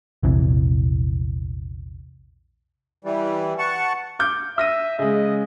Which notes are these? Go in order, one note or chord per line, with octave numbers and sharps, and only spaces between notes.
A#1 E2 C3 E3
E3 G3
F#5 A5 C#6
D6 G6
E5 E6 A#6 D#7
C#3 G#3 D#5